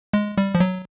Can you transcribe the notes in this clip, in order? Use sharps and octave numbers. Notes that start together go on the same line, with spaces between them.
G#3
G3
F3
F#3